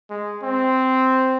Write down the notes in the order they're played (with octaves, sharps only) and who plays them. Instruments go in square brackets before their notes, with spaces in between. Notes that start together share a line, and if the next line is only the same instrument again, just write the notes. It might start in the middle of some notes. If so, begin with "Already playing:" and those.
[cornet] G#3
C4